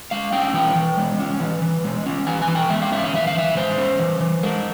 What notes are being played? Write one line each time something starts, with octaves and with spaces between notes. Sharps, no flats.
G#3 F5
C#4 G5
E3 G5
E3
G#3
C#4
E3
E3
G#3
C#4
E3 G#5
G#5
E3
G5
G#3 E5
F5
C#4 E5
F5
E3 E5
F5
E3 E5
G#3 C5
C#4
E3
E3
G#3 A#4